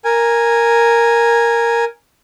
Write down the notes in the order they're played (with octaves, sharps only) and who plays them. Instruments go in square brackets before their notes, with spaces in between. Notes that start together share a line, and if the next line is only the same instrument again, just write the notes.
[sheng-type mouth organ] A#4 G#5